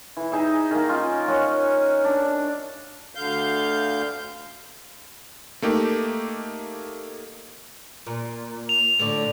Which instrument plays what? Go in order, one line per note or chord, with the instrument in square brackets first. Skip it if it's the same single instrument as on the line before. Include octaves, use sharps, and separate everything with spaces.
[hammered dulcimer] E3
D#4 G#4 E5
D#3 A#3
C#4 F4
A#4 C#5 D#5 F#5
D4
[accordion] D2 D3 F5 G6
[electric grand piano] A3 A#3 D#4 G4
[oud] A#2
[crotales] F7
[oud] A2 D3